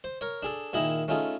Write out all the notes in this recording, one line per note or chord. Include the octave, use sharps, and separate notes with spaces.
C5
A#4 C#5
D4 G#4 A4
A#2 D#3 E4 G#4 D#5
A3 C#4 D#4 F4 G#4 A4